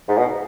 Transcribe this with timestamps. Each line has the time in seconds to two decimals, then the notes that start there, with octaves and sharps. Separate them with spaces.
0.08 G#2
0.18 B2